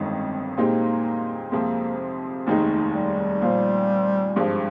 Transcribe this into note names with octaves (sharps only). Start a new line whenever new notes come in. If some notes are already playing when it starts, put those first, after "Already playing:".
Already playing: G1 F2 D#3 G#3
A#2 G#3 A#3 C4 D#4 G4
F2 C3 F3 G#3 A#3 C4
F1 D#2 D#3 G#3 D#4
G3
A#2 F3 C4 F4
G#1 G2 F3 G#3